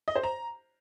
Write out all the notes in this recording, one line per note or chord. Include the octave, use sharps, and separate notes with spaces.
D#5
C5
A#5